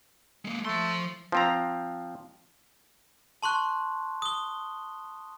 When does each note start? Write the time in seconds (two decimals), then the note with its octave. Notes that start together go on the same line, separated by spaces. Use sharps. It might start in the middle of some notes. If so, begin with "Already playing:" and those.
0.45 G#3 A#3
0.65 F3 A3 C6
1.32 F3 C4 A#5
3.43 A5 C6 C#6 F#6
4.22 D#6 G7